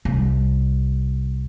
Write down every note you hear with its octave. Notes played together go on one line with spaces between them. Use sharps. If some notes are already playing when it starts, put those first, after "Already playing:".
C2